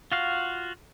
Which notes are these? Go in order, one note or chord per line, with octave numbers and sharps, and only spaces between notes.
F4 F#4 F5